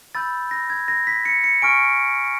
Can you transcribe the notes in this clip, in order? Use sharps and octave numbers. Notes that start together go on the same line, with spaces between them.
B5 E6 G6 A6
A#6
G#6
A#6
B6
C#7
C#7
G#5 C#6 F6 D7